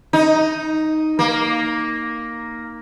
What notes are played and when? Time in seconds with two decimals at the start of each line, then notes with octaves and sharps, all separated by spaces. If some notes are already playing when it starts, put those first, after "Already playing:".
0.13 D#4
1.19 A#3